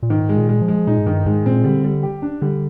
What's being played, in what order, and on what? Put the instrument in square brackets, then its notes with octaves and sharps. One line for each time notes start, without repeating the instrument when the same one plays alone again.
[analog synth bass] A#2
[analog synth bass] G#2 [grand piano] D#3
[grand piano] G#3
[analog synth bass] A#2
[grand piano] G#3
[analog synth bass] F3
[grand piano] G#3
[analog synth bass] A#2 [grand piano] D#4
[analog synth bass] G#2
[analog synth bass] G2 [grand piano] D#3
[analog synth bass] G#2 [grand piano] G#3
[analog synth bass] A#2 [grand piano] C4
[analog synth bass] D3 [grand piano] G3
[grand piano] G3
G4
D4
[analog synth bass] D3 [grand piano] G3